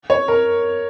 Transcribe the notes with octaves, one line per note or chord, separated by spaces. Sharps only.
C#5
A#4